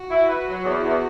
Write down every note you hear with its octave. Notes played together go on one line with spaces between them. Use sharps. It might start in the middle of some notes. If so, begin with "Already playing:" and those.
Already playing: F#4
E4
B4
F#3
E2
E2